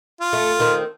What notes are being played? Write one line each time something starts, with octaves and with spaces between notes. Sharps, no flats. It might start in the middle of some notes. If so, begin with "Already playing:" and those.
F4
A3
D#3 C4